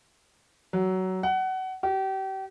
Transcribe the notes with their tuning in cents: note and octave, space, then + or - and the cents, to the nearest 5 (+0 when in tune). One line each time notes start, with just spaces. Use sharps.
F#3 +20
F#5 +25
G4 -35